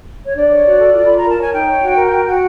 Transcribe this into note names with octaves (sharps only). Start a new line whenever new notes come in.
C#5
D4 D5
C#5
F#4
A4
F4
F4 B5
A#5
A#4 A5
C#5 G#5
D#4 G5
C#5
F#4
A#4
F#4
F#4